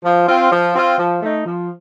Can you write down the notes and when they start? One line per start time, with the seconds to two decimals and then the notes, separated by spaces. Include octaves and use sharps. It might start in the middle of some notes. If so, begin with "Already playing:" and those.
0.04 F3
0.28 C4 F4
0.51 F3
0.75 C4 F4
0.98 F3
1.22 A3 D#4
1.46 F3